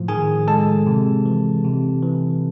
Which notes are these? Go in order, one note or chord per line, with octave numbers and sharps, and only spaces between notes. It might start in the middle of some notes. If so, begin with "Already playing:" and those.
Already playing: A2 F3
D#3 G#4 G#5
G#3 A4 A5
C3
E3
C3
E3